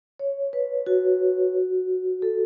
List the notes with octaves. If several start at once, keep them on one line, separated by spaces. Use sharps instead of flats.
C#5
B4
F#4
A4